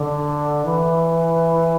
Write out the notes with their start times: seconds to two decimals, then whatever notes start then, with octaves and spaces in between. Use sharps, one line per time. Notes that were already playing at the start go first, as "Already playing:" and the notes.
Already playing: D3
0.65 E3